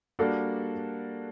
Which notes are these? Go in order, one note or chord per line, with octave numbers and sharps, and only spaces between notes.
G3 A#3 D4 F#4 A4